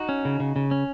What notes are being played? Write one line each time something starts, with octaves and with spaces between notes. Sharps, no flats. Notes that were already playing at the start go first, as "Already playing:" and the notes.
Already playing: D#4 F#4
C#4
C#3
C#3
C#3
C#4